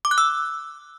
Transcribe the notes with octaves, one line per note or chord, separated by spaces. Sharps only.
D6
F#6
E6